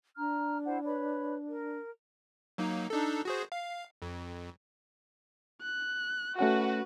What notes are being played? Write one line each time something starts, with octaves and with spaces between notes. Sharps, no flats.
D4 A#5 F6
E4 C5 F#5
B4 C#5 B5
A#4
F#3 A#3 D#4
D4 D#4 A4
F#4 G#4 C5
F5
F2
F#6
A3 C#4 F#4 B4 F#5